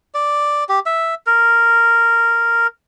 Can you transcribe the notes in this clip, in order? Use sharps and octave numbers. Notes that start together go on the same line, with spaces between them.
D5
G4
E5
A#4